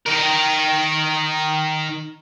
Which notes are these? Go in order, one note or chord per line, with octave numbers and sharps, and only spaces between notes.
D#3 A#4